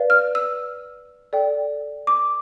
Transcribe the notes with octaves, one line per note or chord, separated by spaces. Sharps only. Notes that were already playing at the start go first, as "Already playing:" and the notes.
Already playing: B4 D5 F5
F6
E6
A4 D5 G5
D6